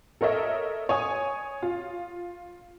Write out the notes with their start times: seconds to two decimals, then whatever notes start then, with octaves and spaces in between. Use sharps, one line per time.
0.21 A4 A#4 C#5 D#5 E5
0.89 C#5 G#5 D#6
1.62 F4